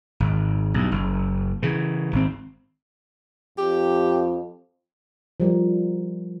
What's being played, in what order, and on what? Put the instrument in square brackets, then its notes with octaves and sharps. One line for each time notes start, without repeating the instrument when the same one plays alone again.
[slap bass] G#1
B1 G2
F#1
C#3 E3
G#1 C4
[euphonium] F2 [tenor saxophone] G4
[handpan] F3 G3 A#4